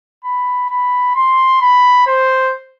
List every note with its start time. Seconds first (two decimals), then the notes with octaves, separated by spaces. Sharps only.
0.25 B5
0.70 B5
1.15 C6
1.61 B5
2.07 C5